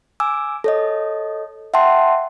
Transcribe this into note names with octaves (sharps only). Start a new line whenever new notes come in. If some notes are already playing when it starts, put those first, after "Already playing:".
G#5 D6 E6
A4 C#5 D#5
E5 F#5 G5 A5 C6